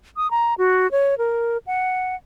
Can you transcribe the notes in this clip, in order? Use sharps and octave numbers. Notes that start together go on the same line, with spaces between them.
D#6
A#5
F#4
C#5
A#4
F#5